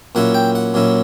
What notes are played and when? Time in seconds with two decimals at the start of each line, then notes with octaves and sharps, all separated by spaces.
0.15 A#2 F#3 C#4 E4 F#5
0.34 G5
0.55 F#5
0.74 A#2 F#3 C#4 E4